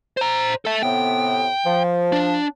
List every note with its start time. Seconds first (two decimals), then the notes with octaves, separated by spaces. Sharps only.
0.17 C5 A#5
0.65 A4 E5
0.83 A2 C3 B3 G5
1.66 F3
2.12 D4